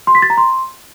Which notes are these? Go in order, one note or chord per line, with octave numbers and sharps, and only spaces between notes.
C6
B6
A6
A#5
C6